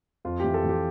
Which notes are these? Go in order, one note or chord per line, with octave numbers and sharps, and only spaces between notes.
F2 F4
E3 G4
A4
E3 G4